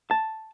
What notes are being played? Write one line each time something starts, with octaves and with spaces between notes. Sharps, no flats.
A5